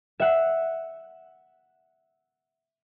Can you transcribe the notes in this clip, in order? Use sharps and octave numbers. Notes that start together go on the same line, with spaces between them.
E5 F#5